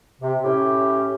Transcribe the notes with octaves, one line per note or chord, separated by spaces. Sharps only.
C3
A2 C#4 G4